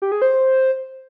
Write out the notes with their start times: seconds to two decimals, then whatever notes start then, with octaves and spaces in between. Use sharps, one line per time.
0.02 G4
0.12 G#4
0.22 C5